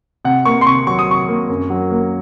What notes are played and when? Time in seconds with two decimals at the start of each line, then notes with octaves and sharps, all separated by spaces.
0.25 C3 F#5
0.45 A#3 C#6
0.61 C6
0.66 C3 C#6
0.87 F#3 C#6
0.99 D#6
1.08 C3 C#6
1.29 A#3
1.49 F#2
1.70 F#3
1.91 A#3